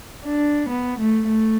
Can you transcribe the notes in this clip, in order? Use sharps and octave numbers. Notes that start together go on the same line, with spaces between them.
D4
B3
A3
A3